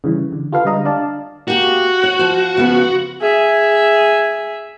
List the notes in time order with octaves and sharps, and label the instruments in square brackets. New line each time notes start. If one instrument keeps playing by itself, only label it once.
[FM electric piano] C#3 E3 G3
D3
F4 G4 A4 B4 F5
D3 G3 G#3 D#5 A#5
D4 D5 F5 A5
[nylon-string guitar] A#3 G4 [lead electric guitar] F#4
[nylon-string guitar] C#5
F3 C5
C#3 F3 B3
[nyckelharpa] G#4 E5